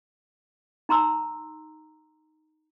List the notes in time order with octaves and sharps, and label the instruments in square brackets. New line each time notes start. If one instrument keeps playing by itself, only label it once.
[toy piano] D#4 A#5 C6 E6